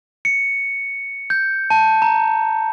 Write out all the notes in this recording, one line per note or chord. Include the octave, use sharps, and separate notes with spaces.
C#7
G6
A5
A#5